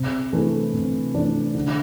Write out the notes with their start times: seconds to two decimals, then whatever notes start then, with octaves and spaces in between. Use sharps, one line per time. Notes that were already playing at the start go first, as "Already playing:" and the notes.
Already playing: C3
0.33 E3 A3 D4
0.74 C3
1.14 E3 A3 D4
1.55 D3